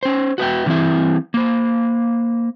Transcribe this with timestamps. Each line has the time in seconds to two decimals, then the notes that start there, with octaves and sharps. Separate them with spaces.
0.03 C#4 C5
0.38 F#4 B4 E5 G5
0.66 D3 E3 G3 C4 E4 E5
1.34 A#3 C5